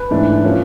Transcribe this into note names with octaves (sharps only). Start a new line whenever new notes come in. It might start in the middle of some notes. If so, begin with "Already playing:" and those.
Already playing: B4
G#2 E3 A3 D4
F3 A#3 C#4